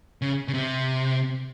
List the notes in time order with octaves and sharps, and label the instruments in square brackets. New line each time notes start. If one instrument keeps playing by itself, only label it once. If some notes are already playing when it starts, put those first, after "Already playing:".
[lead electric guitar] C#3
C#3
C3